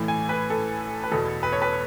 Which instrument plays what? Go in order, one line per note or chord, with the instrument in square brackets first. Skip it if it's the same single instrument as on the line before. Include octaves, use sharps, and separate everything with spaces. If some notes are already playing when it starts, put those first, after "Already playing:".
Already playing: [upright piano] A2 E3
G#5
B4
A4
B4
E2 B2 A4
B4
C#5
B4